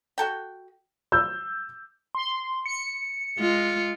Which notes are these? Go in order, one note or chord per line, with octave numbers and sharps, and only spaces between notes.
F#4 A4 G5
E6 G6
C6
C#7
G#3 F4